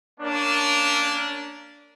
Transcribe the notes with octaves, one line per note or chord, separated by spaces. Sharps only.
A#3 C#4 D4